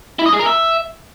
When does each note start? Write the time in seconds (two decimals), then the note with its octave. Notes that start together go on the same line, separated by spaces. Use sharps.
0.19 E4
0.26 D#5
0.32 G#4
0.39 A#4
0.46 E5